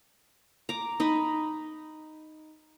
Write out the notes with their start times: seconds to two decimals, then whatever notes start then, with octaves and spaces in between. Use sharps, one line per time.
0.69 A#5 D6
1.00 D#4 D#5 B5